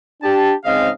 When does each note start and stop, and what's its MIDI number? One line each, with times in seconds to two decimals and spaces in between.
0.22 0.53 62
0.22 0.53 67
0.22 0.53 81
0.65 0.90 44
0.65 0.90 49
0.65 0.90 60
0.65 0.90 75
0.65 0.90 77